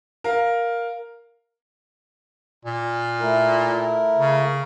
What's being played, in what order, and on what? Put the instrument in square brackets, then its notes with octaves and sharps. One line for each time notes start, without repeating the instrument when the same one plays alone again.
[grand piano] A#4 F5
[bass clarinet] A#2
[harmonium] A3 E4 A#4
[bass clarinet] C#3